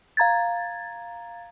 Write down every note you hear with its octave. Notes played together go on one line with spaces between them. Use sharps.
F5 A#5 G#6 A6